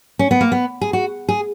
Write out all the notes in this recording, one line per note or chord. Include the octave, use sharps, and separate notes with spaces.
C#4
B3
A#3
B3
G#4
F#4
G#4